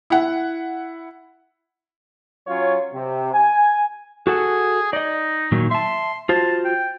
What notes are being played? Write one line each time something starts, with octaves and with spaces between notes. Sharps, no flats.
E4 F#5
F#3 C#4 F4 C#5
C3
G#5
F#4 G#4 A4 F#5
D#4 D5 D#5
A#2 D#3 F#3
E5 A5 C6
F4 F#4 C5 A5
G5